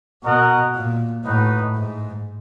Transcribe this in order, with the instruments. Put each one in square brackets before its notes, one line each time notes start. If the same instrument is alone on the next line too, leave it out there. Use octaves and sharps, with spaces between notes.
[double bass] B2 [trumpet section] F#4 A#4 D#5 F#5
[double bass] A#2
[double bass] A2 [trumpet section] D#4 F#4 B4
[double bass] G#2